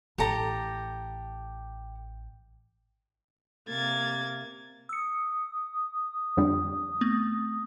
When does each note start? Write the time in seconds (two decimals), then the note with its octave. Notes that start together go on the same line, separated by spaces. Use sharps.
0.18 A1 G4 A4 A#5
3.69 C3 A#3 G#6 A6
4.89 D#6 E6 C#7
6.37 F2 D3 G3
7.01 A3 B3 C4